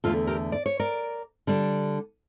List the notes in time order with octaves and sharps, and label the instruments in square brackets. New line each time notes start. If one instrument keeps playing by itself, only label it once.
[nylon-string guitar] E2 D3 A3 F4 A4
G4 A#4
D5
C#5
A#4 D5
D3 G3 D4